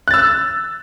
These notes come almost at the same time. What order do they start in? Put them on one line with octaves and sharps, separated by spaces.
F#6 A6 E6